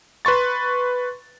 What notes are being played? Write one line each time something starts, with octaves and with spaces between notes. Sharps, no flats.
B4 C6 C#6 A6